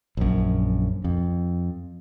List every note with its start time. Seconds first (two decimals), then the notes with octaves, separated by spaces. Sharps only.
0.17 A#1 F#2
1.04 F2